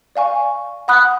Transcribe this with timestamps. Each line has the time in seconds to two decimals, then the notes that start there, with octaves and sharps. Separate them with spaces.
0.16 D5 F5 G#5 C#6
0.88 F#5 B5 D#6 F#6